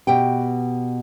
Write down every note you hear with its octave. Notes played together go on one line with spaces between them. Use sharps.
B2 G4 G5